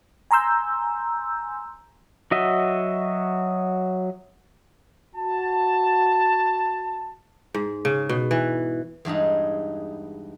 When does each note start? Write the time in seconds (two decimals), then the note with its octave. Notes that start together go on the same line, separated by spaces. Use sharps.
0.31 G#5 A#5 C6 E6 G6
2.31 F#3 F#4 D#5 E5
5.16 F#4 A5
7.54 G#2
7.85 C#3
8.09 B2
8.31 E3
9.05 E2 G2 G#3 D#4